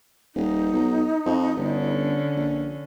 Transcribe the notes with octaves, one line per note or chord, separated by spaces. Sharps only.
D#1 D#4
B1
F2
G1 D3 C#4
A#1